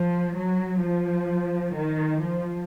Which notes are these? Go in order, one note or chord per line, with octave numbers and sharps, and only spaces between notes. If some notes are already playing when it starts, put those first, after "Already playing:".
Already playing: F3
F#3
F3
D#3
F3